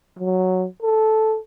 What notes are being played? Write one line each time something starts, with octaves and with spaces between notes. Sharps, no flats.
F#3
A4